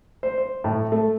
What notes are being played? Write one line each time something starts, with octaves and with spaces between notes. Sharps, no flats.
C5
C5
A2
A3